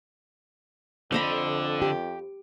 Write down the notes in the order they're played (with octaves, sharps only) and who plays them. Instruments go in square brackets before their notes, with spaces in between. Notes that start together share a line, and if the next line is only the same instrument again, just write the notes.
[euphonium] F2 [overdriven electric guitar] D3 [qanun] C5 D#5 B5
[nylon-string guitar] G4